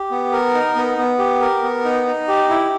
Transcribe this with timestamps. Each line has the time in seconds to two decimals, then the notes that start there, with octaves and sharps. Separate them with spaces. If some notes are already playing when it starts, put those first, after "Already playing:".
Already playing: G4
0.11 B3
0.32 A#4
0.54 D#4
0.76 B3
0.98 B3
1.19 G4
1.41 A#4
1.63 B3
1.85 D#4
2.07 D#4
2.28 G4
2.49 E4